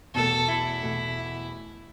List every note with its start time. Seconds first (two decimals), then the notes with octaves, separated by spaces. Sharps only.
0.14 E2 B2 A3 A4
0.48 E4
0.83 E2 B2 A3